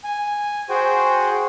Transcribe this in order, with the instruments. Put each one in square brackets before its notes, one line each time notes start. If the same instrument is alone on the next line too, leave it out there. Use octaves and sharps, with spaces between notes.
[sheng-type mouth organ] G#5
F#4 G#4 C5 G5